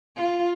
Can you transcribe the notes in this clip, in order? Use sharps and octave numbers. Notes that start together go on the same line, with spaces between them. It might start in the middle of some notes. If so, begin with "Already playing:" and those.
F4